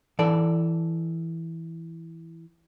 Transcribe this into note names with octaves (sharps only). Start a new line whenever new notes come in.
E3 A4 D5